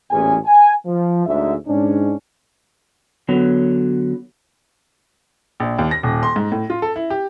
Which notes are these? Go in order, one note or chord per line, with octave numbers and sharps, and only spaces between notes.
A1 E2 A#2 C#4 G#4 G#5
G#5
F3
D2 G#2 E5
G#2 C#4 D4
D3 F#3 B3 C#5
A#1
D#2
A#6
D#1
C6
G#2
A2
F4
A4
E4
G4